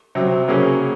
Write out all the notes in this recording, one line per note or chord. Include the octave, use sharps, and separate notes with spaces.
C3 F#3 C4
C#3 F#3 A#3 C#4 G#4